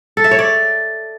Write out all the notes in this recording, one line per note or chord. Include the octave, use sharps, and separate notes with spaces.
A4
E5
C#5
D5